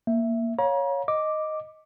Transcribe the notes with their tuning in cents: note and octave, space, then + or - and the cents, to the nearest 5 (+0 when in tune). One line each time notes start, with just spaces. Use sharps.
A#3 +0 E5 +0
C#5 +0 F5 +25 A#5 +40
D#5 +0 D6 +0